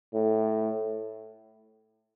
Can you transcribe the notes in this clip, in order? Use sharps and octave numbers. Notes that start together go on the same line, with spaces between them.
A2